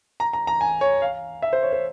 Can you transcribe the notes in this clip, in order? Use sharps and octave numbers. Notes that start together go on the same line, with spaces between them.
A#5
A#5
A#5
G#5
C#5
F5
E5
C5
C#5
C5